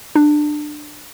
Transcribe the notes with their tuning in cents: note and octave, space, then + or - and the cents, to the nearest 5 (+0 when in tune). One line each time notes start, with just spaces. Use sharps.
D4 +20